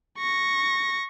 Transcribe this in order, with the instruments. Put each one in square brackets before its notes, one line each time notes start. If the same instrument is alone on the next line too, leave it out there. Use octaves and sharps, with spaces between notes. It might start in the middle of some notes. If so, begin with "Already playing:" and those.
[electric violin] C#6 A#6